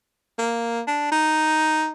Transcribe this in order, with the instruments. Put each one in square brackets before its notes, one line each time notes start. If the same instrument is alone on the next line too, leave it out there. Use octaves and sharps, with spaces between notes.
[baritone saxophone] A#3
D4
D#4